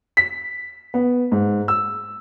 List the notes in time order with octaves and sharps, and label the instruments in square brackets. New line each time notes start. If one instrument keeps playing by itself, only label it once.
[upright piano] B6
B3
G#2
E6